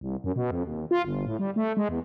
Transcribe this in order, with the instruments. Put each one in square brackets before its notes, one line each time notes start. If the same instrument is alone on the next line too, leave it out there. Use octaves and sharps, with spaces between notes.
[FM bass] C2
F#2
B2
F2
D#2
F4
G1
A2
G3
A3
G#3
E2